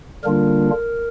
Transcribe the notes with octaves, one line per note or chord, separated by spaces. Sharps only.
D3 G3 A#3 D4 F4 A#4